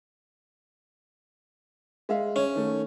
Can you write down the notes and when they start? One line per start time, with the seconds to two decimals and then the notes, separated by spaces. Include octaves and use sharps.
2.09 G#3 E5 F5
2.36 C#4
2.55 D#3 A3